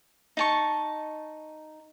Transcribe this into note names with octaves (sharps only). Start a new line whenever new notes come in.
D#4 A5 C#6